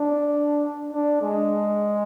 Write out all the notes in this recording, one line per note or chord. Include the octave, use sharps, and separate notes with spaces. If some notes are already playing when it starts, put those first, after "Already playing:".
Already playing: D4
D4
G#3